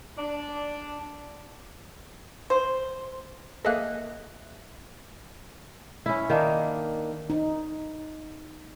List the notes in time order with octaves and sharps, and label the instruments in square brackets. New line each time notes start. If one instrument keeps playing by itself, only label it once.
[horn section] D4
[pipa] C5
[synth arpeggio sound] A#3 G#4 A4 [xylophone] D#5 E5 F#6
[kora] C#4 E4
D#3 A#3 D4
[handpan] D#4